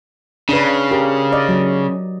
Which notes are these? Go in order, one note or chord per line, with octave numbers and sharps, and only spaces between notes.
C#3 D4 B4
G4 A#4
D5 D#5
F#3